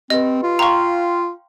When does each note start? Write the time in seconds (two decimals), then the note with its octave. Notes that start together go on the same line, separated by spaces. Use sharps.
0.10 C4 G4 B4 D#5
0.43 F4
0.59 F5 G5 A#5 C6 C#6